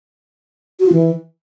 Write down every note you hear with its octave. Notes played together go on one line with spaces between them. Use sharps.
F#4
F4
E3